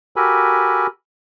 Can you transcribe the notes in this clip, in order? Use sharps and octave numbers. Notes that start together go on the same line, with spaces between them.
F#4 G4 A4 A#4 G#5 B5